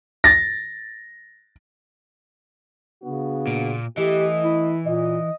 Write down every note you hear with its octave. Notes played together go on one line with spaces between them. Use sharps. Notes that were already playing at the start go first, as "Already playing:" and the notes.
A6 A#6
C#3 B3 D4 F#4
A#2
E3 A3 G4 D#5
E4
A#2 D#5